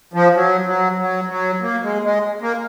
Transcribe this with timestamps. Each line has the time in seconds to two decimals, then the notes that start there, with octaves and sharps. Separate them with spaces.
0.13 F3
0.34 F#3
0.66 F#3
0.98 F#3
1.29 F#3
1.62 A#3
1.83 G#3
2.04 G#3
2.41 A#3